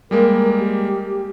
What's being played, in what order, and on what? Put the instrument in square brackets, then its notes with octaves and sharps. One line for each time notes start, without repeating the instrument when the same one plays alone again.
[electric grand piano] G3 G#3 A#3 [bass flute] A#4
[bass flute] G4